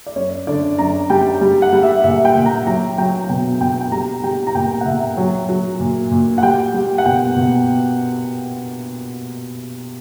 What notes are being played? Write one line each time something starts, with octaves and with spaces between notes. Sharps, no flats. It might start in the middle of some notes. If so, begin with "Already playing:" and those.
D5
F#2 C#5
D3 D5
F#2 A#5
G3 G5
G3
F#5
G3
E5
A#2 E5
G5
A#2
A#5
F#3 A#5
F#3 G5
A#5
B2 G5
B2 G5
G5
G3 A#5
G3 G5
A#5
A#2 G5
F#5
A#2 E5
F#3
F#3
A#2
A#2
F#5
G3 G5
G3
F#5
B2 G5
B2